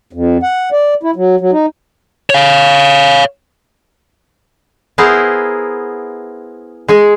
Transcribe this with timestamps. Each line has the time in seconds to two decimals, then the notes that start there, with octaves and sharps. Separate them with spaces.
0.13 F2
0.43 F#5
0.72 D5
1.03 E4
1.16 F#3
1.40 F#3
1.52 D#4
2.30 C#5 F5
4.98 B3 E4 G#4 A#4 C5
6.88 G#3 G#4 G#5